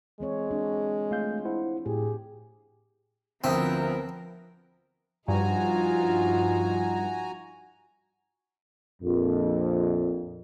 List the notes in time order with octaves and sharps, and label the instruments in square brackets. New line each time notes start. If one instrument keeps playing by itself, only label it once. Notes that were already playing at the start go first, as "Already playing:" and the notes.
[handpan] E3 C4 C#5 [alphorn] G#3
[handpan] C4 D4 F#4
[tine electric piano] A3 F5 G6 [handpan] F4
[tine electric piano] E4 C5 F#5
[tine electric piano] A2 [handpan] G4 [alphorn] G#4
[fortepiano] D2 E5 D#6 [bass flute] F3 [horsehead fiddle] B3 A#4 [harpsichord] C4
[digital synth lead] G2 [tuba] F3 [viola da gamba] D#4 F4 [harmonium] F#4 G#5 A#5
[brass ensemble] A#1 F2